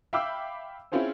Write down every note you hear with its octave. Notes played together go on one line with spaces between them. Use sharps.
E5 F5 G5 B5 D6 E6
C4 C#4 E4 F4 G#4 C5